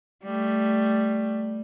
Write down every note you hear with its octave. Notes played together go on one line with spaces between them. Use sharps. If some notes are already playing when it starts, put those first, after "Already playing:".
G3 A3